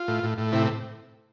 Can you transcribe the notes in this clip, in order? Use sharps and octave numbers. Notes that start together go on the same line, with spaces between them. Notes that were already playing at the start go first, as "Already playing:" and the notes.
Already playing: F4
A2
A2
A2
C3 E4